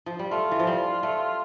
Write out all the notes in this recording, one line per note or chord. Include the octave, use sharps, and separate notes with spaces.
F3
G3
A3 F4
E3
F3
G3
A3